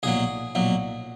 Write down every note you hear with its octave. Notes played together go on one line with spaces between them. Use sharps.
B1 A#2 F#3 G#4
B1 A#2 F#3